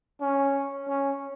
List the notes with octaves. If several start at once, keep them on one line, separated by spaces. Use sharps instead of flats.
C#4
C#4